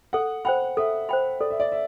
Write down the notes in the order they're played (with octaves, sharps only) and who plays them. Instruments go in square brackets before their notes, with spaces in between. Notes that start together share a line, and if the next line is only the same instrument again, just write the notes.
[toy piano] A4 [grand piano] F#5
[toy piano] C5 G5 B5 [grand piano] F#5
[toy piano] A4 [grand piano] E5
[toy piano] C5 G5 B5
[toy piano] A4 [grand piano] D5
[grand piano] E5
D5
E5